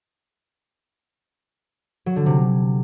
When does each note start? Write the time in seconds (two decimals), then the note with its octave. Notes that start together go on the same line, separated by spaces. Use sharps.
2.06 F#3
2.16 D3
2.26 C3